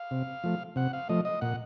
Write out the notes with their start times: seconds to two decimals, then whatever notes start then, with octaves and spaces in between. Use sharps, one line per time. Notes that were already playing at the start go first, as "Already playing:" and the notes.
Already playing: F5
0.11 C3
0.44 F3 A3
0.76 C3 F#5
0.93 F5
1.09 F3 A3 D#5
1.25 D#5
1.41 A#2 F#5